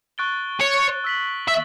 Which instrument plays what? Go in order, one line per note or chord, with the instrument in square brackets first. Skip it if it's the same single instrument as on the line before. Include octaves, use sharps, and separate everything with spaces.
[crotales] C#6 F#6 A6 D7 G7
[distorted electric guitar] C#5
[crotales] E6 B6 F#7
[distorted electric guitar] E5